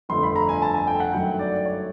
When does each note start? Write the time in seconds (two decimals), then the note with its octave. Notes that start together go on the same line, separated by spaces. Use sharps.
0.09 G1 F2 D3 F3 A3 C6
0.23 B5
0.36 A#5
0.49 G#5
0.62 A5
0.74 G#5
0.87 G5
1.00 F#5
1.13 G1 F#2 D#3 F#3 A3 G5
1.39 D5
1.55 D5
1.66 C#5